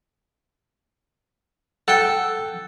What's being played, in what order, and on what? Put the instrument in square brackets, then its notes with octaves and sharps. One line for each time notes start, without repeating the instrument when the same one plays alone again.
[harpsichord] A4 G5 [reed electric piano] F#5 E6 F#6